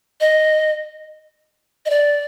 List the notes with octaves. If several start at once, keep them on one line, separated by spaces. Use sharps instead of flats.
D#5
D#5
D5